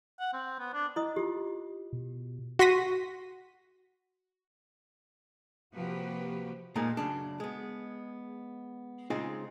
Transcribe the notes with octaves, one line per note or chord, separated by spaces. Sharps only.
F#5
C4
B3
D4
E4 D#5 D#6
F4 G4
B2
F#4 C6 C#6 A#6 B6 D#7
C3 F3 A#3 F#4 G4 B4
F2 A#2 F3 G#3 A#3 D#4
F#2 C#3 D4
G#3 B3
C#3 G#3 C4 D#4 F4 G#4